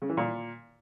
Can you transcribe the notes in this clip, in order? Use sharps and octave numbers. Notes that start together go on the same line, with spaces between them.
C#3
E3
A#2